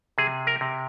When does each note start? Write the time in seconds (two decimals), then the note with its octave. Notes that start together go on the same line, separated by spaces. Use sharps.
0.18 C3 G#4
0.47 A#4
0.61 C3